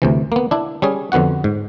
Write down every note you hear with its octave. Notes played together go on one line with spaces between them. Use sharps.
D2 C3 E3
A#3 B3
D4 E4
G3 C#4 G#4
F2 D3 B3 F#4 F#5
G#2